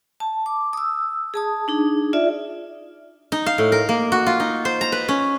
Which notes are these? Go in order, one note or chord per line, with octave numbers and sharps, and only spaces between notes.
A5
D6
D#6 E6
G#4 A5 D#6
D4 D#4 G#4
F4 D5 E5
D#4
F5
A2
A#4
A#3
F#4
F4
D#4
C5
A#5
B4
C#4